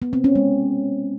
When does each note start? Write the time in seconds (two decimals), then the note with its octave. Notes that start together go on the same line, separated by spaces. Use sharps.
0.02 B3
0.13 C4
0.24 C#4
0.35 G#3